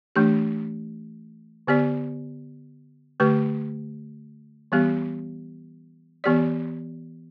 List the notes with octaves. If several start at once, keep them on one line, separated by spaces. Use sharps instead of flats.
E3 A3 D4 G4
D3 B3 G4 D5
D3 A3 G4 B4
E3 G3 B3 G4
E3 B3 G4 D5